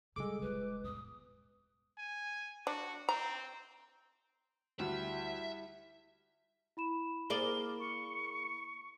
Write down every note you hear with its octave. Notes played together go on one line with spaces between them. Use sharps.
C#3 G3 G#3 A4 D6
D#1 F4 B4
E2 A2 D#6
G#5
D4 F#4
C4 A#5
D2 G3 E4 E5
E4 B5 E7
A#3 G#4 D5 G7
C#6